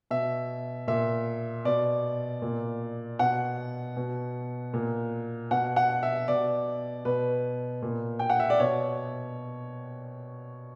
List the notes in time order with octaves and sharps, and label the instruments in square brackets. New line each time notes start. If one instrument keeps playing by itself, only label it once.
[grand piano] B2 E5
A#2 E5
B2 D5
A#2
B2 F#5
B2
A#2
B2 F#5
F#5
E5
B2 D5
B2 B4
A#2
G5
F#5
E5
D5
B2 C#5